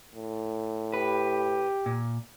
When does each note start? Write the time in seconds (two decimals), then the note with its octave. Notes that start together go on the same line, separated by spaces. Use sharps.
0.15 A2
0.93 G4 B4
1.86 A#2